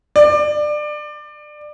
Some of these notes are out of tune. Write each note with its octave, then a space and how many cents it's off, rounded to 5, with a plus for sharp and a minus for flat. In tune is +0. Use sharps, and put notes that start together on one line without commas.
D5 +25